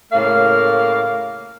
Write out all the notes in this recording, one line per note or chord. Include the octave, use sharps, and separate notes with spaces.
A2 C#3 A#3 F5